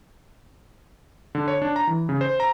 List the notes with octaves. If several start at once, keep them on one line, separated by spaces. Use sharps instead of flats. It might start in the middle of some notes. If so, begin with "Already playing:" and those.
D3
C#5
D4
A#5
E3
C#3
C5
A#5